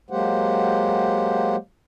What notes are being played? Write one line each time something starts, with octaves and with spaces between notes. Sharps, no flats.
F#3 G#3 A#3 G4 C5 F#5